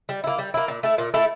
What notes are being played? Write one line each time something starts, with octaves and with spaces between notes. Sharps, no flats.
G3
A#3 E4
G3
A#3 E4
A#2
A3 E4 A4
A#2
A3 E4 A4